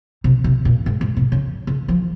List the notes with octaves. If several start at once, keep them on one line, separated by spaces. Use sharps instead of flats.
C3
C3
A#2
G#2
G#2
C3
C#3
C#3
F3